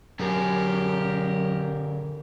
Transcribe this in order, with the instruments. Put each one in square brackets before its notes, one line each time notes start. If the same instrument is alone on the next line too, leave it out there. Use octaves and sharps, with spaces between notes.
[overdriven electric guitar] F#2 [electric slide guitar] D3 G#4 [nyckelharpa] G4 A#4